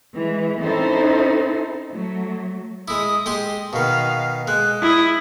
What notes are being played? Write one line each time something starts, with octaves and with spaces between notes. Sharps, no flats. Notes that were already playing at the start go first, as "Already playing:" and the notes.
E3 G#3
C4 C#4 D#4 E4 A4 C5
F#3 A3
G#3 E4 D#6
G#3 G4 C6
B2 D#3 F5
G#3 F#6
E4 D#6